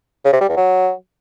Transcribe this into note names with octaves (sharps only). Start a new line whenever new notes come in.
C#3
C3
G3
E2
F#3